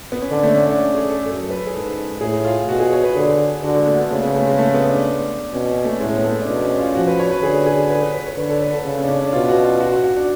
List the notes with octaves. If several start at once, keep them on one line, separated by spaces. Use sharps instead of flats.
B3
C#4
D3 D4
A3
C#4
D4
G#4
A4
F#2 A4
B4
G#4
G#2 A4
A2 G#4
F4
B2 F#4
G#4
C#5
B4
D3 G#4
D3 F#4
G#3
A3
B3
C#3 A3
B3
A3
G#3
A3
B3
D4
B2 C#4
C#4
A3
A2 G#3
B3
A3
D4
B2 C#4
C#4
F4
F3 F#4
B4
C#5
B4
D3 G#4
G#4
B4
B4
B4
C#5
D3 B4
A4
B4
A4
C#3 A4
C#4
D4
C#4
D4
B2 F4
F#4
F4
F#4
F#4
F#4
D4